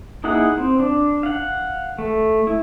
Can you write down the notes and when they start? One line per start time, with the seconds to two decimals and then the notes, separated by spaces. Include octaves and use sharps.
0.24 A#3 D#4 E4 G#4 F#5
0.57 C4
0.80 D4
1.23 F5 F#5
1.99 A3
2.47 E4